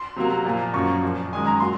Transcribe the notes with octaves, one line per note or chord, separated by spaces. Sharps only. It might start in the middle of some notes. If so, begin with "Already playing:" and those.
Already playing: C6
C3 F#3 A#3
A#2 F3 A#3
F#2 F3 A#3 C#6
A#2 F3 A#3
F#2 D#3 G#3 G#5
A#5
A#2 F#3 A#3 C6